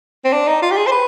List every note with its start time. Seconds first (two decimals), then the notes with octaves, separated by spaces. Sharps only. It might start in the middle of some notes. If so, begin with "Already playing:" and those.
0.24 C4
0.33 D4
0.47 D#4
0.62 F4
0.71 G4
0.77 G#4
0.86 C5
0.92 B4